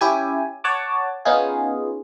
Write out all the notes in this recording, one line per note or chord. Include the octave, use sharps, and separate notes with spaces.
C#4 E4 G4 G#5
C#5 F#5 A5 D6
B3 C#4 D#4 F4 G#4